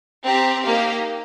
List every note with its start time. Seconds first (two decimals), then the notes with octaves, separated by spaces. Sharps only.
0.25 C4 G4 A#5
0.65 A#3 D#4 G4 F5